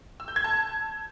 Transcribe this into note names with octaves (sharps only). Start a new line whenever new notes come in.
E6
G6
G#6
A5